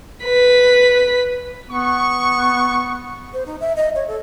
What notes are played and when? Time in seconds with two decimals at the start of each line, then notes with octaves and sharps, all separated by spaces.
0.24 B4 B6
1.70 B3 C#6
3.33 C5
3.46 D#4
3.61 E5
3.76 D#5
3.95 C#5
4.08 A4